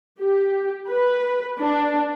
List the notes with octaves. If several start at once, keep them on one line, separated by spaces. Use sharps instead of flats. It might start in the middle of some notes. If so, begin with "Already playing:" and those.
G4
B4
D4